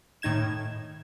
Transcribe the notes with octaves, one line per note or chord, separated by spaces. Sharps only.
A2 D#3 D#4 G#6 E7